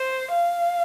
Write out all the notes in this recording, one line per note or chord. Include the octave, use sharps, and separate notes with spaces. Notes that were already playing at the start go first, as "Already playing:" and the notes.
Already playing: C5
F5